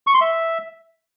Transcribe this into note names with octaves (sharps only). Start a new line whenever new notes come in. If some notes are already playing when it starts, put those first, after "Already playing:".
C#6
C6
E5